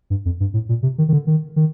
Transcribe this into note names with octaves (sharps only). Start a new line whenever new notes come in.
G2
F2
G2
A2
A#2
C3
D#3
D#3
D3
D#3
D#3